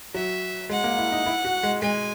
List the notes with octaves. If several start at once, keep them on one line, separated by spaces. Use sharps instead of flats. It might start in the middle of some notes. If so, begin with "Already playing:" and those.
F#3 E5
G#3 F#5
A#3
E4
D#4
E4
F#4
G#3
G#3 G#5